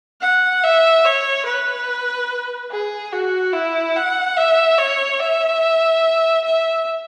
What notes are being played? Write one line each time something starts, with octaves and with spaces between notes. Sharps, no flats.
F#5
E5
C#5
B4
G#4
F#4
E4
F#5
E5
C#5
E5
E5